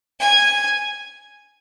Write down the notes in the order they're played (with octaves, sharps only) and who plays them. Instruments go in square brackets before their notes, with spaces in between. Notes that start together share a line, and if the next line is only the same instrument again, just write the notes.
[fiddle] G#5